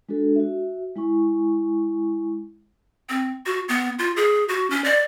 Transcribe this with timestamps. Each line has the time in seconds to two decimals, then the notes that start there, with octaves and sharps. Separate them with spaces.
0.09 G#3 D4 F#4 A4
0.36 F#4 E5
0.96 G#3 E4 G#5 C#6
3.09 C4
3.46 F#4
3.69 B3
3.99 F4
4.16 G#4
4.49 F#4
4.70 C#4
4.84 D5